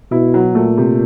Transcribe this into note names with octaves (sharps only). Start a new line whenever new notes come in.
B2 E4
F#3
A#2 A3
C3